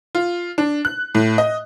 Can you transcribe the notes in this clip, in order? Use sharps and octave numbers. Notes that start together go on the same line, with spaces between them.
F4
D4
F#6
A2
D#5